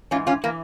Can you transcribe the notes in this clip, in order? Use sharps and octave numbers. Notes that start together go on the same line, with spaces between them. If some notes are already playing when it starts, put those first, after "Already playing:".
G#2 E3 C#4 F4
C#4 F4
E3 A#3